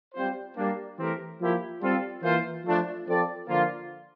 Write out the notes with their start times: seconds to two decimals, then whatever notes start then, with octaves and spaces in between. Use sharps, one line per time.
0.14 G3 C4 F4 C5
0.56 G3 A#3 D4
0.98 E3 A3 C4 G4 A#4
1.39 F3 A#3 E4 G4
1.81 G3 C4 F4 A4
2.22 E3 A#3 F4 C5
2.64 F3 A3 D4
3.06 F3 C4 F4 A4 D5
3.47 D3 F3 A#3 F4